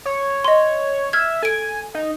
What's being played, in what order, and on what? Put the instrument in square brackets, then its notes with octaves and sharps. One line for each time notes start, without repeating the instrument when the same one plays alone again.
[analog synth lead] C#5
[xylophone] D#5 C6
[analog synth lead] E5 [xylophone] F6 G#6
[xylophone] A4 D7 [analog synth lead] G#5
[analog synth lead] D#4